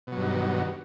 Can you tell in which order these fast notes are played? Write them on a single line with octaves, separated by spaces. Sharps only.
B2 F#3 G2 D#3